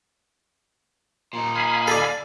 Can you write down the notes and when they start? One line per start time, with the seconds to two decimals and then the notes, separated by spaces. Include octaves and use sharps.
1.33 A#2 D#4
1.55 F5 G#5 B5
1.88 A4 D5